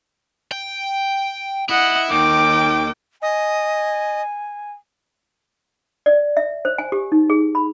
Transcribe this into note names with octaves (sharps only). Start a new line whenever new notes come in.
G5
E4 D#5 F#5
D#2 D#3 G5 D6
D#5 G#5
D5
E5
C5
G#5
G4
D#4
G#4
B5